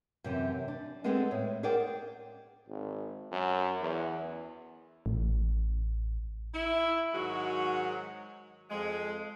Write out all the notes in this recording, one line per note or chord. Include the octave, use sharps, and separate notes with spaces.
F#2 C3 E3
D4
G#3 B3 C4 D4 G#4 A4
A2 C#5
G#4 A#4 C5 D5 F#5 G5
G#1
F#2
E2
A1
E4
G#2 D#3 F#3 G#3 F#4
F2 G#3